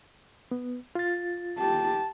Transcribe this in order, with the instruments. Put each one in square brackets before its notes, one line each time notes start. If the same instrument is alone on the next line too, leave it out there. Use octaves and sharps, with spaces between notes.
[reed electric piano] B3
F4 A6
[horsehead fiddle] G4 A5